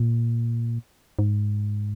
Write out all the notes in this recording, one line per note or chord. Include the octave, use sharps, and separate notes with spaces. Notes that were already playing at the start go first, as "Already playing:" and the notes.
Already playing: A#2
G#2